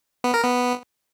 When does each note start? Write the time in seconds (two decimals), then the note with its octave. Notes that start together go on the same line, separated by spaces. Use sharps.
0.24 B3
0.34 A#4
0.44 B3